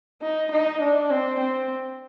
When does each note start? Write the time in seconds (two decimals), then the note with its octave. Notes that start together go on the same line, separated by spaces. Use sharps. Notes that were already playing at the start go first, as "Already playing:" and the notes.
0.22 D#4
0.51 D#4
0.81 D4
1.11 C4
1.40 C4